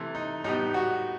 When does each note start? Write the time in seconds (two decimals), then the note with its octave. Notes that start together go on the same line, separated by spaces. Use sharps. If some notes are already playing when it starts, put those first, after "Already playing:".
Already playing: C3 E3 A3
0.15 D#4
0.44 A2 G3 B3 D#4
0.74 F#4